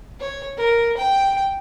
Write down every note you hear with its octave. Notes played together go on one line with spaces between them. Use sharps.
C#5
A#4
G5